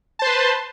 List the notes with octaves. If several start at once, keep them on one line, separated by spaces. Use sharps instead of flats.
B4 C5 A5 C6